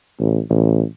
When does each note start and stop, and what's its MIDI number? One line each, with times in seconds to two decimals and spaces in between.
0.19 0.40 33
0.50 0.82 33